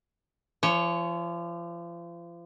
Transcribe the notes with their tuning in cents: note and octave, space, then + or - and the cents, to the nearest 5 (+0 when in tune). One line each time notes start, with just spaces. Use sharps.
F3 -35 C#5 +0